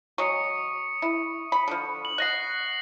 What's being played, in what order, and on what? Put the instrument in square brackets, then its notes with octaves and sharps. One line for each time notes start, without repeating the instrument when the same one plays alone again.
[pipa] F#3 G#3 [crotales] C#6 D#6 C#7
[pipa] E4
B5
D3 F3
[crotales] F#7
[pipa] D#5 F#5 [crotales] F#6 A#6 C7